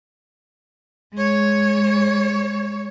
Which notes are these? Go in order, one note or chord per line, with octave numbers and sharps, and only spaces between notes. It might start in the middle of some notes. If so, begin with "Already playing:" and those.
G#3 C#5